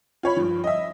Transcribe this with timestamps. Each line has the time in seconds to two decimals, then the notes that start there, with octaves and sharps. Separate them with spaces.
0.23 F4 C#5 B5
0.37 G2 F3
0.64 D#5 E5